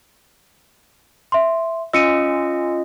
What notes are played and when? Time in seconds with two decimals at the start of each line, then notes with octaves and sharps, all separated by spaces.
1.32 E5 C6
1.93 C#4 F4 D#5 E6 C#7 D#7